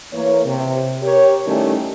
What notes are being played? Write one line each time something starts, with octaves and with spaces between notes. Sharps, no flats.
E3 A#3 C#5
C3
G4 A#4 C#5
D#3 G3 A3 C#4 E4 G4